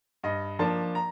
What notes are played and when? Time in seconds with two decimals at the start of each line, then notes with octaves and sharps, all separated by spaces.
0.23 G2 D#5
0.59 F3 A#3 D4 A5
0.95 A#5